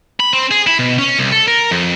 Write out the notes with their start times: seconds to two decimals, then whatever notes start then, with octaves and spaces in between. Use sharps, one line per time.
0.20 B5
0.33 C4
0.51 G#4
0.67 E4
0.79 B2
0.98 C#4
1.19 C2
1.32 A4
1.48 A#4
1.71 F2